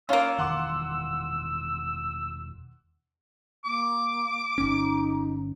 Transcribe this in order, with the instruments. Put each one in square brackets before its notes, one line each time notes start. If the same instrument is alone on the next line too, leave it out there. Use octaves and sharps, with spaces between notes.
[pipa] A#3 F4 [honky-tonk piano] C#4 C#5 F5 [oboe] E6
[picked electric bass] E1 D#3 E3 [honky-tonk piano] F#5 C6 D6
[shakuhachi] A#3 [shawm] D6
[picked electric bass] G1 C#4 [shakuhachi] D#4